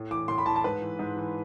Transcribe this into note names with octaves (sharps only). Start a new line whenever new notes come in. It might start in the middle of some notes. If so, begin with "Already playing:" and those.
Already playing: A2
E3 D6
A2 C6
B5
E3 A5
A5
G#2 B4
E3
G#2
E3